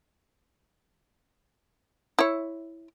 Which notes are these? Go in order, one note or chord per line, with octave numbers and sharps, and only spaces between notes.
E4 C#5